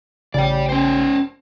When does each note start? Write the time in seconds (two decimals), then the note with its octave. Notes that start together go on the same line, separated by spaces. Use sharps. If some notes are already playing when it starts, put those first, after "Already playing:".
0.34 A1 C#3 D5 G5
0.69 C#4 C5